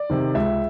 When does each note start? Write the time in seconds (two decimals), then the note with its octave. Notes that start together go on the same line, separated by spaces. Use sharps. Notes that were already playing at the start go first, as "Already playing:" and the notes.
Already playing: D5
0.10 C3 D#3
0.35 C#2 E5